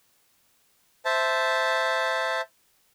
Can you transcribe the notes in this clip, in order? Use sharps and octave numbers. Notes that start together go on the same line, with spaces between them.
C5 E5 A5